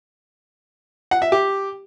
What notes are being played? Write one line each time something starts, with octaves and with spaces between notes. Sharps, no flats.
F#5
E5
G4